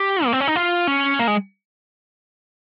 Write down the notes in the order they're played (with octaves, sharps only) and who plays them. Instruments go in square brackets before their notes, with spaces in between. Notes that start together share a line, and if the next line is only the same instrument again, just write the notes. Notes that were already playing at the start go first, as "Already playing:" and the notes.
Already playing: [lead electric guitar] G4
A#3
C4
C#4
D#4
F4
C#4
A#3
G#3